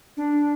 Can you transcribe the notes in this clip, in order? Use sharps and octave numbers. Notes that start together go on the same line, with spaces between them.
D4